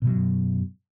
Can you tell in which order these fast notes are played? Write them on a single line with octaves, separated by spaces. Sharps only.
B2 F#3 F#2